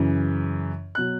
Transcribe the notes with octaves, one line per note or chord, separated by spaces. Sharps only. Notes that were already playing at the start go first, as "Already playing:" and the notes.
Already playing: F#2 C#3 E3
B2 F#3 F#6